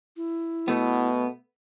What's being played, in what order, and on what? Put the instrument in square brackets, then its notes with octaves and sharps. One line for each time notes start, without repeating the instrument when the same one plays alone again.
[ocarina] E4
[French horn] B2 [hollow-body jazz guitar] A3 B3